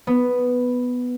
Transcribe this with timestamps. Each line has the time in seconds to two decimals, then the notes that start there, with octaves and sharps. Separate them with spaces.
0.07 B3